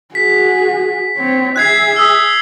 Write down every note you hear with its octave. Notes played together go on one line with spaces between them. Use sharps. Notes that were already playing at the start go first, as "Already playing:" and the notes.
F#4 G#4 B6
C4 C#5
G#4 E5 F#6 G#6 C7
D#6 E6